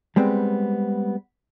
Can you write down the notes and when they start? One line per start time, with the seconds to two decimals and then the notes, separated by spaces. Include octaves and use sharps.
0.16 G3 G#3 B3 C4